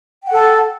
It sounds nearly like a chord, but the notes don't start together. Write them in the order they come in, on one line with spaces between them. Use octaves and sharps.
G5 F#5 A4 A5